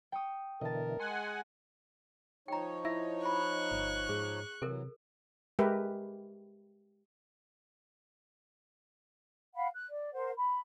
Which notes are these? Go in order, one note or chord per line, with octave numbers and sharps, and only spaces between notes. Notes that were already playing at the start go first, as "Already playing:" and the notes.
G5 C#6 D#6
B2 D3 E3 A#4 D#5 A5
G#3 F#5 G#5 C6
F3 D#4 C#5 G5 A#5
E4 E5
B5 C#6 F#6
G1
G#2 G#4
C3 E3 F#3 A4 A#4
G#3 G4 A#4 B4 E5
F5 F#5 B5
F#6
D5
A#4 C5 F#5
B5